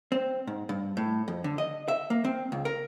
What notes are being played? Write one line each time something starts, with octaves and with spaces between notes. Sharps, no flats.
C4
G#2
G2
A2
F2
D3
D#5
E5
A#3
C4
C#2
A#4